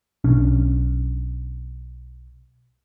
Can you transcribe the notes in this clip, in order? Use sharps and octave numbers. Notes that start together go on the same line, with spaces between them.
B1 C#4 D4